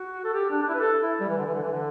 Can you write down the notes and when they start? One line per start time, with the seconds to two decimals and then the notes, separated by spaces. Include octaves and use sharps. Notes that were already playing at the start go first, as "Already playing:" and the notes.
Already playing: F#4
0.24 A4
0.34 G4
0.50 D4
0.63 D4
0.69 E4
0.74 B4
0.80 A4
1.03 E4
1.20 G3
1.29 E3
1.37 D3
1.45 E3
1.54 D3
1.63 E3
1.72 D3